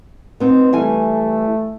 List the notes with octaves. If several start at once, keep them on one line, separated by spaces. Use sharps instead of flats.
B3 C4 D#4
E3 G3 A3 G#5